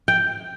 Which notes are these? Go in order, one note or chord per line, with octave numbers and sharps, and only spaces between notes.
G5